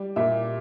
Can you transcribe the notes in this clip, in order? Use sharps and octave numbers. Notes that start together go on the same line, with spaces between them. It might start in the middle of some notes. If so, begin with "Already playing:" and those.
Already playing: G3
A#2 E5